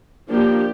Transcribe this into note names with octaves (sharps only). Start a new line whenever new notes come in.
F3 A#3 D4 G4